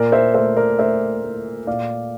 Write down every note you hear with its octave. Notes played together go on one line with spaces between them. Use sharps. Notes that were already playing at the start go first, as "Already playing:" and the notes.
Already playing: A#2 A#4 D5
C5 E5
A3 C5 E5
A#4 D5
A3 C5 E5
A3
A#2 D5 F5